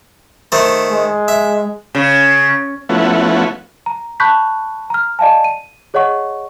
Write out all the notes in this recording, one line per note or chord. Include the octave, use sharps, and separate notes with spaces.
D#3 A3 C5
G#3
E5
C#3
F3 A3 B3 C#4 E4 F#4
A#5
A5 B5 C#6 F#6 G6 B6
A#5 F6
D5 D#5 F5 G#5 A5
D#7
G#4 C#5 D#5 F#5 C#6